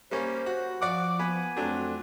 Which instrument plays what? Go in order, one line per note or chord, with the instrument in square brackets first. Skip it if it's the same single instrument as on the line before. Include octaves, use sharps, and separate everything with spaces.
[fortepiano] G3 A#3 C#4 [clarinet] C5
[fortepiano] F#4 F#6
[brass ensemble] F3 [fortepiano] D5 F#5 [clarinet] D6
[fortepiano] B3 B4 [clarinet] G#5
[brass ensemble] F2 C4 A4 [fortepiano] F#3 A3 D4